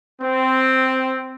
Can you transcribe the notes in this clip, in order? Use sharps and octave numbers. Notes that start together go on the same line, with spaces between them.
C4